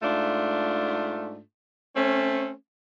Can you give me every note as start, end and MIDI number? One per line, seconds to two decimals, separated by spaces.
0.02 1.40 44
0.02 1.40 57
0.02 1.40 62
0.02 1.40 65
1.96 2.52 57
1.96 2.52 60
1.96 2.52 61